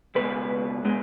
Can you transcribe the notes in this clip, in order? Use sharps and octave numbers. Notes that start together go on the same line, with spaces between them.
C#2 B2 G#3 B4
B2 G#3